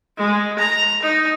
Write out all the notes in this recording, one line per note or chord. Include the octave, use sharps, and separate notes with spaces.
G#3
A#5
D#4